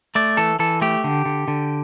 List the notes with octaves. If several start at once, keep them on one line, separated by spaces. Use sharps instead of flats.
A3 D5
E3 A4
E3 A4
A3 G4
D3
D3
D3